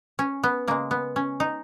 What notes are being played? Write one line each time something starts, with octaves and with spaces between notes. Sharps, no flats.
C#4
B3
C#3 G#3 A#3
B3
C#4
D#4